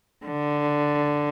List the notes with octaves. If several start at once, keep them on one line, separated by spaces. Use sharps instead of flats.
D3